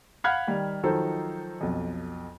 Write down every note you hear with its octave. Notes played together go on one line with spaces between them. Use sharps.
F5 F#5 B5 F6 F#6 G#6
D#3 G3
D#3 F3 F#3 D#4 A4 C5
B1 F2